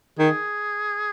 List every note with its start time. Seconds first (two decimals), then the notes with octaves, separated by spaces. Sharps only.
0.19 D#3 G#4